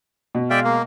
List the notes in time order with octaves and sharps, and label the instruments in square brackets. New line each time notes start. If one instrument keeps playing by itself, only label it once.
[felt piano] B2
[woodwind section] G#3 F5 [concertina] D5 E5 G5
[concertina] A#3